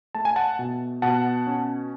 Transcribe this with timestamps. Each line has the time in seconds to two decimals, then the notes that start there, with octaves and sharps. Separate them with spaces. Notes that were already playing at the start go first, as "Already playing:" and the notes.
0.15 A3 A5
0.25 G#5
0.36 F#5 A5
0.59 B2
1.02 B2 F#5 A5
1.47 C#4